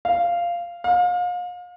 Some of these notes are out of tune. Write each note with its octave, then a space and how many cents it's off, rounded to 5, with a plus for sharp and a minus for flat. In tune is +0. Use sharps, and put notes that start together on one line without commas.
F5 -10
F5 +35